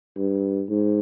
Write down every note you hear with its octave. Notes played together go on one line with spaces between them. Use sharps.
G2
G#2